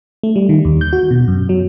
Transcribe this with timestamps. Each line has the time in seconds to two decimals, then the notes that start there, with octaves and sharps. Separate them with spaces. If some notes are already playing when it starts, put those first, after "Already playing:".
0.23 A3
0.36 G3
0.49 D#3
0.65 D#2
0.81 G6
0.93 F#4
1.11 B2
1.28 F#2
1.49 F#3